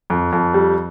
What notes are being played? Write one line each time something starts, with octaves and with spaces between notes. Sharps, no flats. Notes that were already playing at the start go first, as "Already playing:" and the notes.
F2
F2
G3